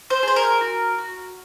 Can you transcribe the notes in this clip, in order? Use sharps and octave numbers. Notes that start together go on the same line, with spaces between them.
C5
G#4 C5
A#4
F#4
F#4